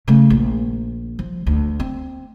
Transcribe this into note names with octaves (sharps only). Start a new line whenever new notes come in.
C#3 A3
A#1
F3
D2
C4